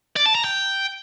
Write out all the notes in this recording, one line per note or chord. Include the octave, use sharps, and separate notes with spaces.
D5
A5
A#5
G5